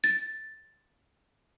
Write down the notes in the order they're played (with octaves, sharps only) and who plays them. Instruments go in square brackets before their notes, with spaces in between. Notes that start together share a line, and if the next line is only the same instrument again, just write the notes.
[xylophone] A6